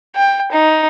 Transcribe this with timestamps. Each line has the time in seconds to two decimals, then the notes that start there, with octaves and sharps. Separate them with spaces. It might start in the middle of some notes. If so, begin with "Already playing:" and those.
0.16 G5
0.52 D#4